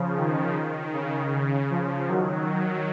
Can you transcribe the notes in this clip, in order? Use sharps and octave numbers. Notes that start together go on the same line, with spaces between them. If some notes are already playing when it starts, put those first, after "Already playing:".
Already playing: C#3 F3
D#3
C#3
C#3
C#3 F3
D#3 F#3